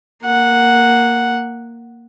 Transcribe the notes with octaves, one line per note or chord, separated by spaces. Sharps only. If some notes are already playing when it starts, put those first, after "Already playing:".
A#3 F#5